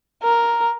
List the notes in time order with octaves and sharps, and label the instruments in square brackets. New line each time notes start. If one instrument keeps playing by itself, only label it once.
[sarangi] A#4